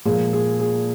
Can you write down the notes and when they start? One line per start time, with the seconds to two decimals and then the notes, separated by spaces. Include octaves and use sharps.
0.05 A#2 F3 G#3 G#4
0.33 G#4
0.60 G#4